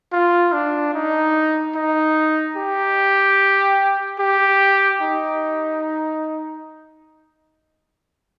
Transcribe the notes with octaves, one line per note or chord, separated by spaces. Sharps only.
F4
D4
D#4
D#4
G4
G4
D#4